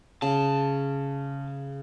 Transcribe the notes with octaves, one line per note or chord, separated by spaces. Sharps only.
C#3 A5